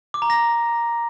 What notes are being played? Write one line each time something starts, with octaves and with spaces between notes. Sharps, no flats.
D6
A#5
A#6